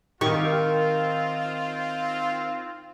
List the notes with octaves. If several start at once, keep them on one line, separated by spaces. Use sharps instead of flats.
D#3 C4 D#4 F4 G4 C#6